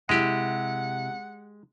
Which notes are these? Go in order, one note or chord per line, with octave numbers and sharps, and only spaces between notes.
C3 G#3 E4 G4 F#5